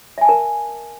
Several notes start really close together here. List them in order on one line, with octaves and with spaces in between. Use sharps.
E5 G#5 A5 A#4